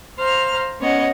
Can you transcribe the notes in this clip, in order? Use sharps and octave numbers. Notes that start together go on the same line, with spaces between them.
C5 F5 A#5 F6
B3 C#4 C#5 D#5 F#5